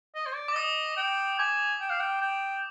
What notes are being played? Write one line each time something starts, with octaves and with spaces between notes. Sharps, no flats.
D#5
C5
D5
D6
D#5 D#6
G5
G#5 D6
G5
F5
G5
G5